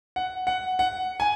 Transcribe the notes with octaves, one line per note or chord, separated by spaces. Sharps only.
F#5
F#5
F#5
G#5